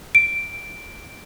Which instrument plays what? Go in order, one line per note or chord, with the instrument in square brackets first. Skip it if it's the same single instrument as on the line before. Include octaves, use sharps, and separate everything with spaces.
[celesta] D7